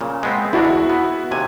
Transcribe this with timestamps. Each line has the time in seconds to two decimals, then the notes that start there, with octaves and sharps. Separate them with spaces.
0.01 A#2 C#3
0.23 G#3 B3 C4
0.53 D2 D4 E4 F#4 A#4
0.65 E2
0.89 B3
1.31 D#2 C3 G#5